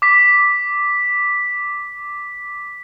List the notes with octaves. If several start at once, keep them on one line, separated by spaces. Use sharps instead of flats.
D6 B6